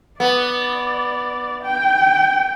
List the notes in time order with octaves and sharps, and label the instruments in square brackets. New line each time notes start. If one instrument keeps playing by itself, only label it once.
[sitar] B3 [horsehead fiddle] D5
[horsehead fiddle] G5